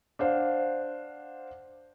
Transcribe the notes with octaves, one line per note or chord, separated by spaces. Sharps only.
D4 C5 F5 F#5